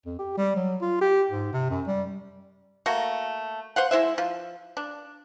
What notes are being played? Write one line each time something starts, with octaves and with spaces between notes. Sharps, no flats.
F2
G4
G3
F#3
F4
G4
G#2
C3
F#2
G3
A3 A#3 F#4
C5 F5 F#5
G#3 E4 C5 E5
F3
D4